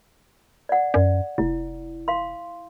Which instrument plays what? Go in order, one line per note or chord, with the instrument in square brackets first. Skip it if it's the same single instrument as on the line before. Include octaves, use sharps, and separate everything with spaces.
[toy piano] D5 F#5
[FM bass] F#2 [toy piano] D5
[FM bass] F1 [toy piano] E4
[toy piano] F5 C6